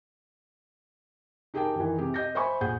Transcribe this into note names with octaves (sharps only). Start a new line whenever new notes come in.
D#4 G4 G#4 A#4 G5 A5
D#3 E3
C3 G4 G#4
D#5 G6 A#6
C5 E5 G#5 B5 C#6
A#1 G#4 F#5 G6